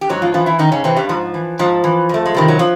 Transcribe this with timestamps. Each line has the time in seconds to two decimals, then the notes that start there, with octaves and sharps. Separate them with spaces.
0.01 G4
0.09 G#2 F#3 F#4
0.22 F3 F4
0.34 E3 F3 F4
0.46 E3 E4
0.59 G#2 D#3 D#4
0.72 C#3 C#4
0.84 C3 E3 C4
0.96 G2 G3
1.09 G#2 F3
1.34 E3
1.59 G#2 F3
1.84 E3
2.09 F2 A3
2.26 G#3
2.34 C3 D#3 G3
2.48 F#3
2.59 F3